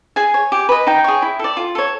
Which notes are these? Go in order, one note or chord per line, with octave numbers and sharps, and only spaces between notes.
G#4 G#5
C#5
G4
B4 D#5
D#4 G5
G#4 C#5
E4
A4 D5
F4
A4 C#5